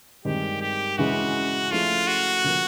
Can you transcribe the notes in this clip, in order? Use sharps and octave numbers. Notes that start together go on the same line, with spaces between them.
G2 D#3 G#3 C4 G4
G4
C#3 E3 G#3 F#4
F3 A3 C#4 E4 F4 G#4
F#4
C#3 F3 A#3